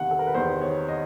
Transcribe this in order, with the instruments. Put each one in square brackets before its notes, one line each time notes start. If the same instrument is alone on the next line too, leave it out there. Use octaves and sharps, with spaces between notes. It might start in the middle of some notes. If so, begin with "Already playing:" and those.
Already playing: [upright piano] E2 C3 D#3 F5 F#5
A4
A#4
B4
E2 C3 D#3 C5
C#5
D#5